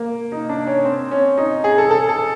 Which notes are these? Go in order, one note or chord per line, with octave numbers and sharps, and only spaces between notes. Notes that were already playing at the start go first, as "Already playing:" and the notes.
Already playing: A#3
D#4
D4
C#4
C4
C#4
D#4
G#4
A4
A4
A4